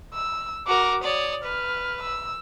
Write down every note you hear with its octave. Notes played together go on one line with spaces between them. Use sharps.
E6
F#4 A#4 D6
C#5 D5 D#6
B4 F6
E6